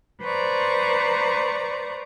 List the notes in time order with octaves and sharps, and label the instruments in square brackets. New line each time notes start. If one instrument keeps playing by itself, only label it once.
[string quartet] B4 C5 D5 A#5 C#6